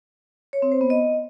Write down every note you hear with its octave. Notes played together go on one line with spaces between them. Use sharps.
C#5
C4
C5
B3
D#5